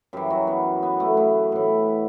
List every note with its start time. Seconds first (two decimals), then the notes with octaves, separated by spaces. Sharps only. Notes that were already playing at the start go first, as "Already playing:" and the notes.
0.13 F#2 E3 G3 G4
0.30 F#3 F#4
0.47 B3
0.83 B3
1.00 A3
1.17 A3
1.52 A2 E3